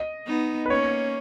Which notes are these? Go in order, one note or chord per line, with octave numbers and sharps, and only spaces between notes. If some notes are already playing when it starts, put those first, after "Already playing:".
Already playing: D#5
B3 D#4
B4
A#3 C#4 C#5